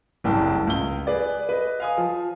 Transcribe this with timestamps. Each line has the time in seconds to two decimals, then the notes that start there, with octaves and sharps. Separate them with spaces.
0.24 F#1 C2 G5 A5
0.67 C#2 G7
1.07 G#4 B4 D5
1.49 B4 D#5
1.80 F5 G#5 D#6
1.98 F3